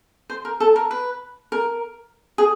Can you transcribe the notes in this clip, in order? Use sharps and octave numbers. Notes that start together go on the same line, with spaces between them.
C5
A#4
A4
A#4
B4
A#4
G#4